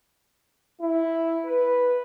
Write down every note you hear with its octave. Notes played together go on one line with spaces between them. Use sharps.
E4
B4